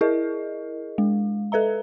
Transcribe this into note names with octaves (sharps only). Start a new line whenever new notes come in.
E4 G#4 A#4 D#5
G#3
A4 B4 E5 A#5